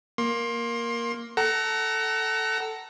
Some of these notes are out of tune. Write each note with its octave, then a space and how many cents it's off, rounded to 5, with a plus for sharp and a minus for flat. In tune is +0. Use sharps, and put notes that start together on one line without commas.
A#3 +5 C6 +25
A4 +0 F#5 +30 A#5 +0